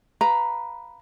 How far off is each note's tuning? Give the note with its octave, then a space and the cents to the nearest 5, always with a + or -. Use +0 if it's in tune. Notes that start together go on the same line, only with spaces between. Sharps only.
B4 +0 F5 +0 A#5 +0